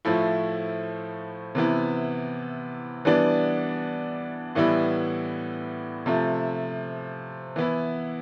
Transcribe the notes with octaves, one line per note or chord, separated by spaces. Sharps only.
A2 F3 A3 E4
C3 E3 B3 E4
E3 G3 B3 D4
A2 E3 G3 B3 E4
C3 F3 A3
E3 B3 E4